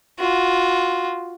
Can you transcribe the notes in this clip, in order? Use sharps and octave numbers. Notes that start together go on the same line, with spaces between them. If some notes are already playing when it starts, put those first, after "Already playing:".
F4 F#4